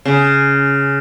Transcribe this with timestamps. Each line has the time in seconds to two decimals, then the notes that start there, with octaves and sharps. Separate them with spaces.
0.05 C#3